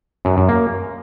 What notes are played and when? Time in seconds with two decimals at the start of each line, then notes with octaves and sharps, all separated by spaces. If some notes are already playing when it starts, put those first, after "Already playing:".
0.25 F#2
0.37 F#2
0.49 A#3